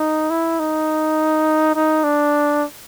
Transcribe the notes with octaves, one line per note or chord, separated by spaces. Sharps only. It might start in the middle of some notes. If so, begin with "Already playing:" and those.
Already playing: D#4
E4
D#4
D#4
D4